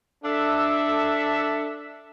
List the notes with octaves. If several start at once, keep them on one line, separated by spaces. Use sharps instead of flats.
D4 A4 E5